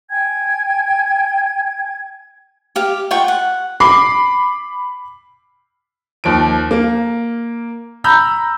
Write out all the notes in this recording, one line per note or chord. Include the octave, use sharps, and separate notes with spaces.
G5 G#5 G#6
G4 F5
F4 F#5 G5 C#6
F#5
B5 D6 C7
D#2 F3 D7
A#3
A#5 B5 E6 G6